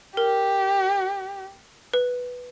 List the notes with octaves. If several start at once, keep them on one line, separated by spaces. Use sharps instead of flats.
G4 A#4
B4